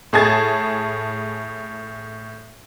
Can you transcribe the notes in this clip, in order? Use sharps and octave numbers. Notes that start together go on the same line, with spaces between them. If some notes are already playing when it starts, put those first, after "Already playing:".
A2 G#4 A5 G#6 A6